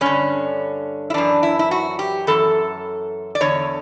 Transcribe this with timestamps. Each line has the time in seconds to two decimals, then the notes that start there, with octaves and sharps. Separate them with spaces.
0.01 G2 D3 C#4
1.10 E4
1.14 F#2 E3 D4
1.43 E4
1.59 E4
1.71 F#4
1.99 G4
2.27 F#2 E3 A4
3.35 D5
3.41 E2 D3 C#5